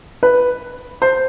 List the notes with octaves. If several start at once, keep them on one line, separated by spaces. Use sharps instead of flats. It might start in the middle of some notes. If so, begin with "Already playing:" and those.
B4
C5